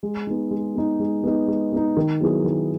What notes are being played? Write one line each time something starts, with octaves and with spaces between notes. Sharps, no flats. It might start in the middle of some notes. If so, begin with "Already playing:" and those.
G#3
B3 D#4
G#3
B3 D#4
G#3
B3 D#4
G#3
B3 D#4
D#3
F#3 B3 E4 G#4
D#3